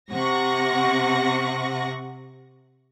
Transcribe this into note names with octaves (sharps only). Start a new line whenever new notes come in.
C3 F#5 C#6 A#6